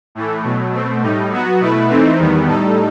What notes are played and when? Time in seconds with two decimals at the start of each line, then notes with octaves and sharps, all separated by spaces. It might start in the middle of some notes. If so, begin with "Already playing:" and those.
0.15 A2 E3 A3
0.44 B2 F#3 A3
0.73 B2 A3 C4
1.02 A2 G3 D#4
1.31 F#3 B3 F#4
1.60 B2 A3 E4 B4
1.89 E3 A3 C4 D#4
2.19 E2 D#3 G3 B3
2.47 A2 G3 D#4 A4